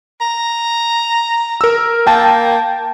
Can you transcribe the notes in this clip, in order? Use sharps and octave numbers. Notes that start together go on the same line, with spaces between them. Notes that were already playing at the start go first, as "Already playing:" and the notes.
A#5
A#4 E6
A#3 G5 A5